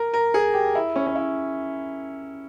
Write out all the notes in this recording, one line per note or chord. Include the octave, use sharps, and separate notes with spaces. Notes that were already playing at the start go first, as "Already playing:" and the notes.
Already playing: A#4
A#4
G#4
G4
E4
C#4
C#4
E4